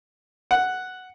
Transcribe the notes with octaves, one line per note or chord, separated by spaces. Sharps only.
F#5